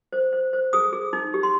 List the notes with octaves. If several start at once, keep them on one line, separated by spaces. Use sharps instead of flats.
C5
C5
C5
G#4 D#6
G#4
D#4
G4
C6